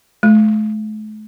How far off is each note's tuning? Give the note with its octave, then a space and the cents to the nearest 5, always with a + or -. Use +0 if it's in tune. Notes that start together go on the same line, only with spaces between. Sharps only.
A3 -40